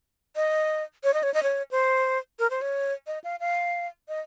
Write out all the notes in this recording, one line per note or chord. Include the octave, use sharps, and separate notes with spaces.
D#5
C#5
D#5
C#5
D#5
C#5
C5
A#4
C5
C#5
D#5
F5
F5
D#5